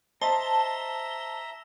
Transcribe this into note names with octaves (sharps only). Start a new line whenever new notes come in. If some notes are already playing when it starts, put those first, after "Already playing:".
C5 D#5 E5 A5 A#5 G7